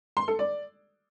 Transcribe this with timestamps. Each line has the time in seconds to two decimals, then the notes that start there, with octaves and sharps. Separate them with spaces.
0.17 C6
0.28 A4
0.39 D5